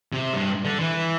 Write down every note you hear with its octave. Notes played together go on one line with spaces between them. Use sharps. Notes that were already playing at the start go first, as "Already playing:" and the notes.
C3
G2
D3
E3